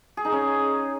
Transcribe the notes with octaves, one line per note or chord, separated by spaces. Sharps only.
G#4
D#4
C#4